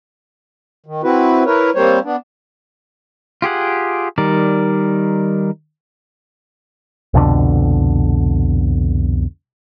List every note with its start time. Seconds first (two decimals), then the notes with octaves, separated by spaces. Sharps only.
0.86 D#3
1.03 C4 E4 F#4 B4
1.46 E4 A#4 B4 C#5
1.75 G3 A#3 C4 C5 C#5
2.04 B3 D4
3.42 F4 G4 G#4 F#5
4.18 D#3 G3 A#4 D5
7.14 C2 F2 B2 D3